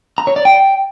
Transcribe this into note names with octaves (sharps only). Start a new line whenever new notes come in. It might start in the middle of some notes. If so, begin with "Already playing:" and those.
A#5
C#5
D5
G5